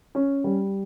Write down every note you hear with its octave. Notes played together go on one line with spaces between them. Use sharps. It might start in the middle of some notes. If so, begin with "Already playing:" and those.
C#4
G3